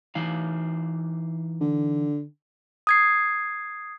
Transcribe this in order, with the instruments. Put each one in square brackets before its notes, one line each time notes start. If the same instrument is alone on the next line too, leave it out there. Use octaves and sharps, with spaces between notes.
[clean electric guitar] E3 D#4 F5
[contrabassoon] D3
[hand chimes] D#6 G#6 C7